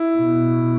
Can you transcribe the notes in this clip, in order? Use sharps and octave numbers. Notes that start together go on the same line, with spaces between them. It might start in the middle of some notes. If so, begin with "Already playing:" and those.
Already playing: E4
B2